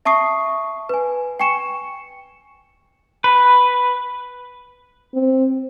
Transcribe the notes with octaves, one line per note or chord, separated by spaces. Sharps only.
E5 A5 C#6 D#6 C7
B4 G#5
G5 G#5 C#6 C#7 E7
B4
C4